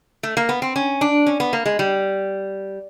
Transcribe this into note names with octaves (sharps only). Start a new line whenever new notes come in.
A3
A#3
B3
C4
C#4
D4
C#4
B3
A#3
G#3
G3